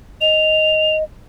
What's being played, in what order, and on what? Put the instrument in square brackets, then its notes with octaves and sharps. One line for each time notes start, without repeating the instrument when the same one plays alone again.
[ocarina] D#5 [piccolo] F7